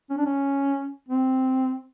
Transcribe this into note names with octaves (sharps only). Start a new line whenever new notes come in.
C#4
D4
C#4
C4